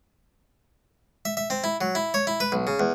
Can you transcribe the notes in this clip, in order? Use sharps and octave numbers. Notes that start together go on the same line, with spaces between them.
E5
E5
C4
E4
F#3
E4
C#5
E4
B4
B1
C#3
E2